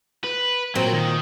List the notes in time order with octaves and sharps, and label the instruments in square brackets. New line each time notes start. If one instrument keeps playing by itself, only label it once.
[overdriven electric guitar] B4
[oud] A#2 C4 [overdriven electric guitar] F#3
[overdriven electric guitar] D#3